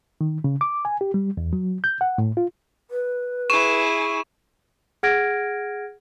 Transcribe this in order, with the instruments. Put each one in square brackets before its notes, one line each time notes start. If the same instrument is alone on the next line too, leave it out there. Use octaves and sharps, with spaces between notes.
[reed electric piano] D#3
C#3
D6
G#5
G4
G3
E2
F#3
G6
F#5
A2
F4
[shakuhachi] B4
[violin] E4 G#4 [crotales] C#6 E7
[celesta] G#4 F#5 F6 G#6 A#6 D7